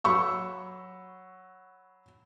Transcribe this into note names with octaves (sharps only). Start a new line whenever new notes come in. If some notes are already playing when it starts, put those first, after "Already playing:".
F#3 B5 C#6 E6